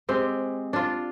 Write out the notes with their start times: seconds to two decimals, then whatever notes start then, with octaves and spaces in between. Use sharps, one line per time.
0.09 G#3 C4 G4
0.73 D4 F4